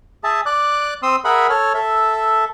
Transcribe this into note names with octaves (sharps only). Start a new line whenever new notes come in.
G#4 E5 A5
D5 D6 F#6
C4 C6 D#6 E6
G#4 A#4 E5 F#5 B5
A4 C#5 F6
A4 E5